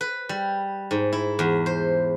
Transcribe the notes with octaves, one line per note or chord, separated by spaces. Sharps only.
B4
G3
G#2
E4
E2
C5